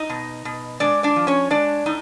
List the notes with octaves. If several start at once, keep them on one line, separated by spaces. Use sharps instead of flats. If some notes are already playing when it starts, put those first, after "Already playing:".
Already playing: D#4 D#5
B2
B2
G#3 D4 D5
D4 D5
F3
C#4 C#5
G#3 D4 D5
A2 D#4